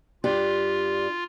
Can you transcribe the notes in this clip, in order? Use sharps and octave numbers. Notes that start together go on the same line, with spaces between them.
G2 D4 F4 G4